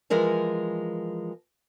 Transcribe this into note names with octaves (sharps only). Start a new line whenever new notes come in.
E3 F3 G#3 A#4 G#5